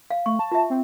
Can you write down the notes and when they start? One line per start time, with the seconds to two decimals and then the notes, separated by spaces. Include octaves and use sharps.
0.11 F5
0.26 A3 C#6
0.39 A5
0.52 F4 E5
0.70 C4